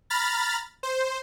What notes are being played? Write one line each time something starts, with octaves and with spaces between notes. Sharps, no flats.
A#5 B5 F6 A6
C5